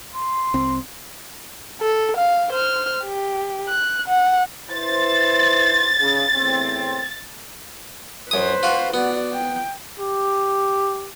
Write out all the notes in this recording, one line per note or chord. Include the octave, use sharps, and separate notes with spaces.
C6
C2 C4
A4
F5
C5 F6
G4
F#6
F#5
E4 B4 C5 A6
C#3
E2 A2 C4
F#2 B4 C5 D#6
F4 F#4
B3 F#4 D5
G5
G4